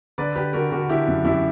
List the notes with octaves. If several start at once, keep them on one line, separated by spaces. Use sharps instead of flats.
D3 B4 D5
D3 G4 B4
D3 F#4 A#4
D3 F#4 A#4
D3 E4 G4
F#2
F#2 E4 G4